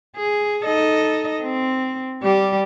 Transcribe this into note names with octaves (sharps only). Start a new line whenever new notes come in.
G#4
D#4 A4 D#5
C4
G3 G4